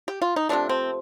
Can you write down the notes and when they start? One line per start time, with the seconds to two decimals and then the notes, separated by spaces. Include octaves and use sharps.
0.08 G4
0.22 F4
0.36 D#4
0.49 C3 F3 A3 D4
0.69 C4